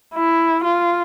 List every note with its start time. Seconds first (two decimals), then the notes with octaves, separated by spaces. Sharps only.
0.14 E4
0.64 F4